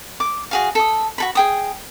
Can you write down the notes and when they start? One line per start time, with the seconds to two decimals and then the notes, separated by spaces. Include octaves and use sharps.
0.20 D6
0.51 F#4 G#4 F5
0.75 A4 D#6
1.18 F#4 A4 B5
1.35 G#4 G5 D#6